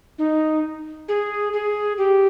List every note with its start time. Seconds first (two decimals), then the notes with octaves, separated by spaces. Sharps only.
0.18 D#4
1.08 G#4
1.53 G#4
1.98 G4